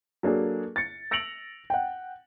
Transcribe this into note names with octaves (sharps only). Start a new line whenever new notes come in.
F#3 A#3 D4 G#4 A4
A6 C#7
E6 A#6 C#7 D7 F7 F#7
F#5 G5